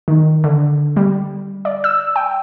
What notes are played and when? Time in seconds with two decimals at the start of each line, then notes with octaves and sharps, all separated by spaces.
0.08 D#3
0.44 D3
0.96 G3
1.65 D5
1.84 E6
2.16 G5